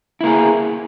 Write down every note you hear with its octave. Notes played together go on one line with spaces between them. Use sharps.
A#3 E4 G#4